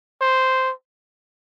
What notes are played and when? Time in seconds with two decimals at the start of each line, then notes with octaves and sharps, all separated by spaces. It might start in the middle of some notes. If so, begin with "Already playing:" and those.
0.21 C5